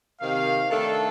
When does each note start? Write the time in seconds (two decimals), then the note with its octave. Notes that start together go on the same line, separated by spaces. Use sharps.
0.21 C3 D#3 A#3 F5
0.70 D#3 A3 D4 A4